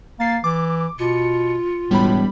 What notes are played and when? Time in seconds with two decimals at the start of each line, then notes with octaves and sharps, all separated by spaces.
0.20 A#3 A6 C7
0.44 E3 D6
0.99 B2 F4 C#7
1.91 E1 A2 G3 B5